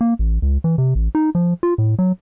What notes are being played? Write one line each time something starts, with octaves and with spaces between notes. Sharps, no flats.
A#3
A1
C#2
E3
C3
A1
D#4
F3
F4
A2
F#3